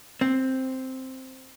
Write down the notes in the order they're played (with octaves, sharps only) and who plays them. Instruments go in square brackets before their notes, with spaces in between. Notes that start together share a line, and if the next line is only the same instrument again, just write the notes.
[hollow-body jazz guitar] C4